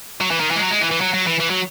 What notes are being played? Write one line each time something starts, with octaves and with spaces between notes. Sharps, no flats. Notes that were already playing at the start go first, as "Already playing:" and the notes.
F#3
E3
D#3
E3
G#3
F#3
G#3
E3
E3
F#3
F#3
E3
E3
F#3